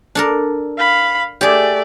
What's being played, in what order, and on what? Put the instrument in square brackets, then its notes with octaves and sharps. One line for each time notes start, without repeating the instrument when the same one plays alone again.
[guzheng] D4 A4 A#4
[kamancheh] F5 B5
[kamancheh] A3 D5 [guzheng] G4 G#4